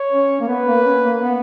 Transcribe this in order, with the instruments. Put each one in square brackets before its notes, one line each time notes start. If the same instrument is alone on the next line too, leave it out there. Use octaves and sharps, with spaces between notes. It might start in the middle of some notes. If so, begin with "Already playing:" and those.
Already playing: [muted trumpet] C#5
[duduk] C#4
A#3
[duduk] B3 [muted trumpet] B4
[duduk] A#3
C#4
A#3
B3